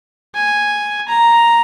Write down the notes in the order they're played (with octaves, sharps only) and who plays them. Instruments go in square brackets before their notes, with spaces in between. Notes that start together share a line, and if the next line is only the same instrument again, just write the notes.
[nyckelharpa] G#5
A#5